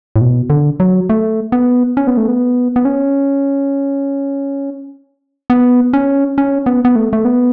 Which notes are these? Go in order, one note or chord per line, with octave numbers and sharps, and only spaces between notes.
A2
B2
D3
F#3
A3
B3
C#4
B3
A3
B3
B3
C#4
B3
C#4
C#4
B3
B3
A3
A3
B3